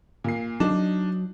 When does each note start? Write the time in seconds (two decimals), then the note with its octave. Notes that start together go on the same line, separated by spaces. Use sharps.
0.24 A#2 C7
0.60 F#3 D4 D#4